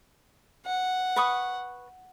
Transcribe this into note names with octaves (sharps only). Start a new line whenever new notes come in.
F#5
B4 C#6 D#6